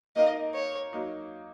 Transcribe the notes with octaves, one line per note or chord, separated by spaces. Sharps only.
A#3 D#4 A#4 D#5 F5
C#5
F#3 A#3 D#4